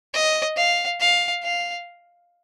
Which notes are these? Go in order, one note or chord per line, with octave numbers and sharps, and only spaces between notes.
D#5
F5
F5
F5